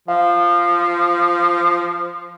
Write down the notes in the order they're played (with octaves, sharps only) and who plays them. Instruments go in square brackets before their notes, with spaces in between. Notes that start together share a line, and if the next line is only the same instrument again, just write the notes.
[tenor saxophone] F3 [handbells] F5